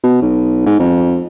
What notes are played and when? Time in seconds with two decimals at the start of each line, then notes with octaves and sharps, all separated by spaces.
0.03 B2
0.22 B1
0.66 G#2
0.80 F2